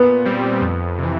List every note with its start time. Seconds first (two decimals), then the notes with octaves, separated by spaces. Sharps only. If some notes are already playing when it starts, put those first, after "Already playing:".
Already playing: A#2 B3
0.25 G3 C4
0.62 F2
0.99 C3 E3